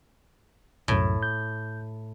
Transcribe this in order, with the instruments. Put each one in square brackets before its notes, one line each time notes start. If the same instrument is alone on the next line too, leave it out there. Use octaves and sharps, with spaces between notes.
[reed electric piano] C2 F#2 [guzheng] A2
[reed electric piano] G6